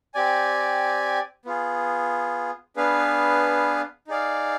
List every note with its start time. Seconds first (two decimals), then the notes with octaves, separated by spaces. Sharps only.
0.14 C4 G4 D5 G#5
1.45 B3 F4 G#4
2.76 B3 D4 G#4 B4 F5
4.08 D#4 G#4 D5 F5